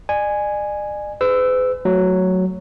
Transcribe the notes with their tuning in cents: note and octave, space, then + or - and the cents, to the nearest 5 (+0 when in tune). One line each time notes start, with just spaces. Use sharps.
D5 +45 G#5 +0
G#4 +5 B4 +45 E6 +0
F#3 +0 A3 +0